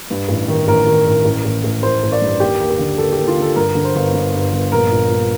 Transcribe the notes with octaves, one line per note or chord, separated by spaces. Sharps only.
G2
A1
D#3
A1 A#4
D#3
A1
A1
A1
A1
A1 C5
A1
D5
G2
D#2 G4
D#2
G4
D3
D#2 A4
G4
D#2
F4
D3
A4
G2 A#4
D3
C5
G1
D3
G2
G1
A#1 A#4
A#2
A#2